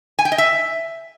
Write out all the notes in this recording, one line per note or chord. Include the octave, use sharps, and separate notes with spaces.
G#5
G5
D#5
E5